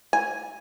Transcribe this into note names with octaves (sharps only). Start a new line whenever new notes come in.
G#5